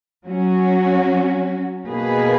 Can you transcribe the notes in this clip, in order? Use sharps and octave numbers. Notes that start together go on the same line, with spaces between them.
F#3 C#4 F#4
B2 A#3 D#4 G#4 B4